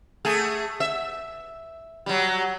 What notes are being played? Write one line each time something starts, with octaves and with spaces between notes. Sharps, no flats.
A3 G#4
E5
F#3 G3